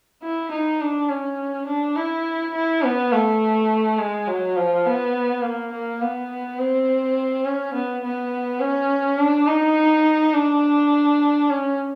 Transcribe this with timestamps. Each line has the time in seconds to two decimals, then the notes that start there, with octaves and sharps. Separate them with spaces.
0.22 E4
0.51 D#4
0.81 D4
1.09 C#4
1.67 D4
1.96 E4
2.54 E4
2.83 B3
3.12 A3
3.98 G#3
4.28 F#3
4.56 F3
4.86 B3
5.42 A#3
5.72 A#3
6.01 B3
6.59 C4
7.45 C#4
7.74 B3
8.04 B3
8.60 C#4
9.19 D4
9.48 D#4
10.34 D4
11.49 C#4